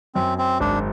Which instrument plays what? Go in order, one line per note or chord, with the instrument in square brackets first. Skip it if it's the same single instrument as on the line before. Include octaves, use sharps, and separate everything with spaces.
[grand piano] F#2 [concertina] C4
[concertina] C4
[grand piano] G#1 [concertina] D4